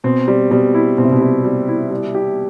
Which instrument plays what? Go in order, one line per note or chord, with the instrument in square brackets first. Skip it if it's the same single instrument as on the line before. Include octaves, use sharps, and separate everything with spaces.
[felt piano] B2 [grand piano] C4
[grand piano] G3
[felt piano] B2 [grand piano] G3
[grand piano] E4
[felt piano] B2 [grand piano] C4
[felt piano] C3
B2
[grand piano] G3
G3
E4
G3
G4